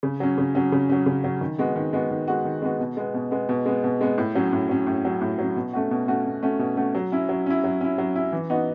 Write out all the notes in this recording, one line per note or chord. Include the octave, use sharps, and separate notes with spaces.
C#3
F#3 C#4
C#3
F#3 C#4
C#3
F#3 C#4
C#3
F#3 C#4
D#3
G#3 B3 F#4
D#3
G#3 B3 F#4
D#3
G#3 B3 F#4
D#3
G#3 B3 F#4
B2
G#3 B3
B2
G#3 B3
B2
G#3 B3
B2
G#3 B3
A2
F#3 C#4
A2
F#3 C#4
A2
F#3 C#4
A2
F#3 C#4
B2
A3 C#4 F#4
B2
A3 C#4 F#4
B2
A3 C#4 F#4
B2
A3 C#4 F#4
F#3
C#4 E4
F#3
C#4 E4
F#3
C#4 E4
F#3
C#4 E4
E3
B3 D#4 F#4